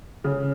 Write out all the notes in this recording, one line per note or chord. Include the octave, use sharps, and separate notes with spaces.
C#3